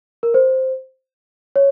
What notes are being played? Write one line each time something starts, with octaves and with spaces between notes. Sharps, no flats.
A#4
C5
C#5